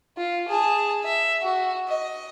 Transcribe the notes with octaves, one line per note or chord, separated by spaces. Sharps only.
F4
G#4 A5
E5
F#4
D#5